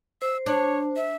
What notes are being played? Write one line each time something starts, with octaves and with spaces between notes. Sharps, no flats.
C5 E6
D4 C#5
E5